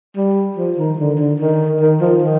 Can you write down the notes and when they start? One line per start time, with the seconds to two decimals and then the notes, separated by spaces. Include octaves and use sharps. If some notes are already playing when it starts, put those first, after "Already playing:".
0.17 G3
0.57 F3
0.78 D#3
0.98 D3
1.20 D3
1.40 D#3
1.81 D#3
2.01 F3
2.22 D#3